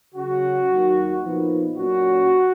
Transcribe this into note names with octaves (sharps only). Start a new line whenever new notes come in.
C#3 F#3 C#4 F#4
D#2 D#3 F#3
A#2 F3 B3 D#4
A#2 F#3 C#4 F#4